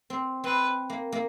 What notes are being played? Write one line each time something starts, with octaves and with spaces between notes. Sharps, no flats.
C4
C4 B4
A#3
A#3